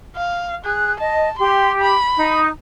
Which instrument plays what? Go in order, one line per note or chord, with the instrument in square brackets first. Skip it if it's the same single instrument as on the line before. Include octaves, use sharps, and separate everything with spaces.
[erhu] F5
[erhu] G#4 [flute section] F#6
[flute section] D#5 [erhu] A5
[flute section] G4 [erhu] C6
[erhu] B5
[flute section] D#4